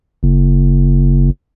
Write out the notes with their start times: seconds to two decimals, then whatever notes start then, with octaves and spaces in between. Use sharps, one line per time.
0.23 F#1